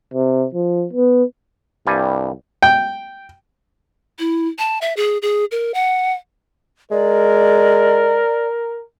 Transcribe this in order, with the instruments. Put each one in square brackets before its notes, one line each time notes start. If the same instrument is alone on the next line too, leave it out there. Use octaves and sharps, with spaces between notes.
[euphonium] C3
F3
B3
[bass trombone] C2 [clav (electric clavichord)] G2 G3 G#5
[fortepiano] G5
[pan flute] E4
A5
E5
G#4
G#4
A#4
F#5
[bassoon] G#3 [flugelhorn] A#4 [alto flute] D5